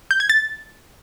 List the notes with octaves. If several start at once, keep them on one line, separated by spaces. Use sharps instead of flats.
G6
G#6
A6